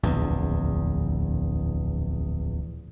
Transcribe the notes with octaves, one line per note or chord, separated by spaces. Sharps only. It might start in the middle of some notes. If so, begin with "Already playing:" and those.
D1 A#1 E2